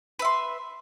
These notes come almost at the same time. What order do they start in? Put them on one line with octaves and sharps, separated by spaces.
B4 E5 C6